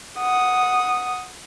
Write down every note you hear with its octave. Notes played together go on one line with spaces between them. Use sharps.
F#5 D#6